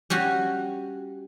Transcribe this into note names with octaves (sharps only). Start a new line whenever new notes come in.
G3 C#4 F#4